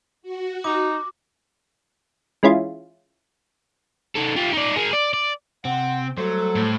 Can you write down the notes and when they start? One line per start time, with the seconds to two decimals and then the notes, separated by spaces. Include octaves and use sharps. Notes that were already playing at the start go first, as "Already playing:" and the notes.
0.22 F#4
0.64 D#4 D6
2.43 E3 G#3 C#4 E4 F4
4.15 D#3 A4
4.36 F4 G4
4.53 D#4 D5
4.76 G#4 A#4
4.93 D5
5.13 D5
5.65 C3 C4 F#5
6.18 F#3 G3 A3 A4 C5
6.56 A2